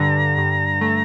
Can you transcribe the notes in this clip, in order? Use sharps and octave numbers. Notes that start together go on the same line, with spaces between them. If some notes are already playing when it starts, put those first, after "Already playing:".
Already playing: G2 D3 A#5
G2
A3